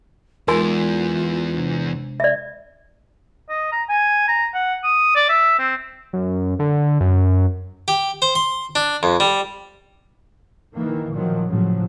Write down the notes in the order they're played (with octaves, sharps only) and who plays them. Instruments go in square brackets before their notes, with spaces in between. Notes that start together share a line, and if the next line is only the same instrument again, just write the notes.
[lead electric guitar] E2 [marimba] G#3 D#4 [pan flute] F4 [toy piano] A#4 G#5 C6
[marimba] C3 D4
[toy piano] D5 E5
[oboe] D#5
A#5
G#5
A#5
F#5
D#6
D5
E5
C4
[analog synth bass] F#2
D3
F#2
[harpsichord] G4
C5
C6
D4
F2
G3
[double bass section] D#3 E3 A#3
A#2 D#3 F3 F#3
A2 C#3 F3 F#3